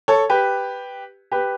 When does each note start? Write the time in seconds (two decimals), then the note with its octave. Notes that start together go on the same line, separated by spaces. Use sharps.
0.08 A4 C#5
0.30 G4 B4
1.32 G4 B4